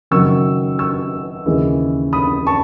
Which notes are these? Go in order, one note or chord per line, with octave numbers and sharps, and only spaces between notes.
F#1 F#2 D#3 F#3 C#6 E6
C#6 E6
D#2 C#3 E3 G#3
B5 D#6
A5 C#6